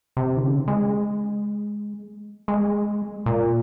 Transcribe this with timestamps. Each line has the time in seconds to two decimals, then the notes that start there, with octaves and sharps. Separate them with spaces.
0.17 C3
0.37 D#3
0.42 C#3
0.68 G#3
2.48 G#3
3.26 A#2